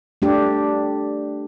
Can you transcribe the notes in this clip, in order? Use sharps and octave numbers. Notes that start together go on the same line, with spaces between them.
A3 D4 G4